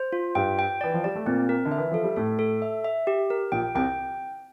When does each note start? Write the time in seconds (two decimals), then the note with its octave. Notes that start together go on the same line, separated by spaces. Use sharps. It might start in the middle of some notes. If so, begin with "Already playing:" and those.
Already playing: C5
0.13 F4
0.35 G2 G3 G5
0.59 G5
0.81 E3 D5
0.94 F3
1.04 G3 D5
1.15 A3
1.26 A#2 A#3 C4
1.49 A#4
1.65 D3
1.71 E5
1.78 E3
1.92 F3 A4
2.04 G3
2.16 A2 A3 A4
2.39 A4
2.62 E5
2.85 E5
3.07 G4
3.30 A#4
3.52 A#1 A#2 G5
3.75 C2 C3 G5